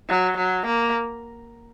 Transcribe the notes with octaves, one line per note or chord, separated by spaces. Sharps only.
F#3
F#3
A#3